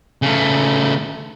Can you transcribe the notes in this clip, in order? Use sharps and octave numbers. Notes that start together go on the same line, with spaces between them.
C#3 A3